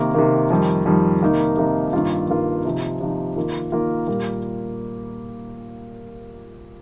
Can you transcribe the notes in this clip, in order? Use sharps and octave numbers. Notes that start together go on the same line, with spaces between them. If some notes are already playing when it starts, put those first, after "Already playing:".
Already playing: C3 D#3 A#3
C3 D#3 A#3
F2 D#3 G3
F2 D#3 G3
C3 D#3 A#3 D#4
C3 D#3 A#3 D#4
G2 D#3 A#3 F4
G2 D#3 A#3 F4
C3 F3 D#4
C3 F3 D#4
D#3 A#3 F4
D#3 A#3 F4
A#2 G3 A#3